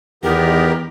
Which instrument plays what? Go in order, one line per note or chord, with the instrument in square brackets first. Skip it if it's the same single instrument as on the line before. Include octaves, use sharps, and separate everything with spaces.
[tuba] E2 [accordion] D#3 B3 G4 [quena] A#4